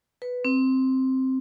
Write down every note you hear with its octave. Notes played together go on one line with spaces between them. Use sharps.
B4
C4